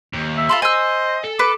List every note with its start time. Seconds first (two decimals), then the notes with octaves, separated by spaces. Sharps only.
0.13 D#2
0.37 E5
0.49 F4 A4 B5 C6
0.62 C5 D#5 G#5 E6
1.24 A4
1.39 B4 D6